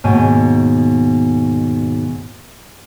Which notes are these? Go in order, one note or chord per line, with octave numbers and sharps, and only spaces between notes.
D#2 G#2 B2 G#5